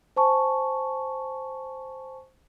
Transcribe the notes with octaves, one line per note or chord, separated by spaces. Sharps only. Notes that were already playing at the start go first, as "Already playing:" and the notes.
C5 G#5 A5 C#6